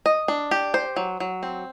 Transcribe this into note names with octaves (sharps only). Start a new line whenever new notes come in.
D#5
D4
G4
C5
F#3
F#3
C4